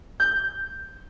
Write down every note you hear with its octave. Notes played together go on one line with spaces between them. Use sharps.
G6